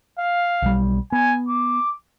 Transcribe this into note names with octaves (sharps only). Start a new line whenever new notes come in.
F5
B1 G3
B3 G#5
D6